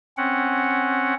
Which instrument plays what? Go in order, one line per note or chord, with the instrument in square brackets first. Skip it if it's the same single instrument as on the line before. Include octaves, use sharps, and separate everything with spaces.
[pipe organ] C4 C#4 F#5